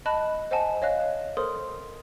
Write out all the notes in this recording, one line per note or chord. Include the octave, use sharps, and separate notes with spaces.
D#5 A5 B5 F#6
C5 D#5 F#5 G#5 A5
C#5 D#5 F5 F#6
A4 A#4 C5 C6 D#6